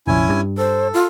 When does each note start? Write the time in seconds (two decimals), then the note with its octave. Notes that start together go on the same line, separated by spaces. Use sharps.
0.07 F1 A#1 C#4 E4 G#5
0.29 G2
0.58 A4 C5
0.94 F4